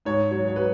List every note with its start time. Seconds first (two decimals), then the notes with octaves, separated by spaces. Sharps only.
0.05 G#2 C#5
0.31 F#3 C#5
0.48 C#5
0.56 F#3 B4